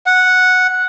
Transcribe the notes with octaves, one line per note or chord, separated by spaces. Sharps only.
F#5